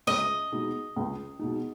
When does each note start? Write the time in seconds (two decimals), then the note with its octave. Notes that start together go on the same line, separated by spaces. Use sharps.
0.07 C#2 D#5
0.52 B2 G#3 D#4
0.96 C#2
1.39 B2 G#3 D#4